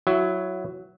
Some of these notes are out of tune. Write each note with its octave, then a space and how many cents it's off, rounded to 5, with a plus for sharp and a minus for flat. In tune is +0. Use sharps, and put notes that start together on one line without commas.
F#3 +0 E4 +20